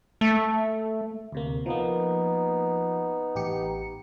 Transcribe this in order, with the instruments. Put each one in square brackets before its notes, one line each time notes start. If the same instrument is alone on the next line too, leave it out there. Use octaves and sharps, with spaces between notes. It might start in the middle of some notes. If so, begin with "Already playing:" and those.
[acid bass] A3
[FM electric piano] D2 C3 A#3
[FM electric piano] F3 A#3 [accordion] B3 D#4
[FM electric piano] A1 G4 C#7